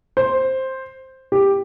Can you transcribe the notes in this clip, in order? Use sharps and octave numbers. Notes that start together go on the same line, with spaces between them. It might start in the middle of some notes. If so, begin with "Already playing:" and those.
C5
G4